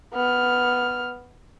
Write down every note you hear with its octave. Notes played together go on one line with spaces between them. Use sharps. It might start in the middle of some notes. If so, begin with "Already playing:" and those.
B3 F6